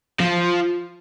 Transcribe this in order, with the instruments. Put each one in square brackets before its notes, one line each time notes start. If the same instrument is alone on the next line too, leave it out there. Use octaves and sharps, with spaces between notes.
[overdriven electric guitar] F3